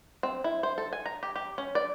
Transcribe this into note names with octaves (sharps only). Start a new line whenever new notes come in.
C4
E4
C5
A4
G#5
A#5
G4
G4
C#4
D5